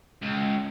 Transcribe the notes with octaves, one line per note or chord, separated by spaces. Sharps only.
C#2